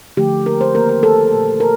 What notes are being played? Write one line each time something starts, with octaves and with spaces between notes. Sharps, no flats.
D3 F3 A3 G4
A#4
C5
D#3 A#3 A#4
A#4
A4
A#2 A3
A#4